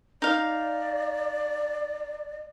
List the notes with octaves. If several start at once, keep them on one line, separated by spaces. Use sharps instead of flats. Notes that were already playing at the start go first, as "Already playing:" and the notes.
D#4 D5 F5